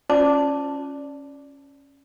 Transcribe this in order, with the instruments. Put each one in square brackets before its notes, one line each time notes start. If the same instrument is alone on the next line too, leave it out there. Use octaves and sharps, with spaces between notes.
[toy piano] C#4 F4 C5 D5 A5 D6